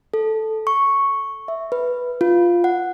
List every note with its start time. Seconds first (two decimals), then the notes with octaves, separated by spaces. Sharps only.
0.14 A4
0.67 C#6
1.48 E5
1.72 B4
2.21 F4
2.64 F#5